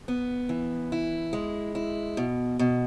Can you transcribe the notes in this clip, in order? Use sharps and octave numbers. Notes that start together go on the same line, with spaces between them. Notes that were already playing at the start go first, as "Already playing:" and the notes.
B3
E3
E4
G#3
E4
B2
B2